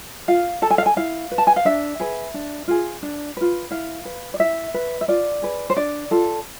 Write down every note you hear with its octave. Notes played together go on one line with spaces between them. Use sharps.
F4 F5
A4 A5
G#5
F5
G#5
E4 F5
B4
A5
G#5
F5
D4 E5
G#4 B4
D4
F4 G#4
D4
F4 B4
E4 F5
B4
D5
E4 E5
B4
E5
F4 D5
G#4 B4
C5
D4 D5
F4 A4